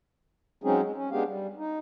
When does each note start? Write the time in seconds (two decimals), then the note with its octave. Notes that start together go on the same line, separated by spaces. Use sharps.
0.64 F#3 G#3 C4 C#4 D#4 G#4
0.82 G#3
0.96 C#4
1.11 G#3 B3 D4 G4 G#4 F5
1.26 G3
1.57 D#4